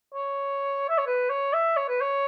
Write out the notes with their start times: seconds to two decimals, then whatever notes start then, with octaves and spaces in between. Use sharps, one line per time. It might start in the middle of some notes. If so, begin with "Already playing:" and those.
0.14 C#5
0.89 E5
0.98 C#5
1.07 B4
1.30 C#5
1.53 E5
1.76 C#5
1.88 B4
2.01 C#5